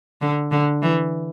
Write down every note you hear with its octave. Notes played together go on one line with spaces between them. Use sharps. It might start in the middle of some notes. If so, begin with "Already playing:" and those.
D3
D3
E3